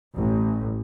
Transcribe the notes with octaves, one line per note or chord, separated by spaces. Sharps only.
A1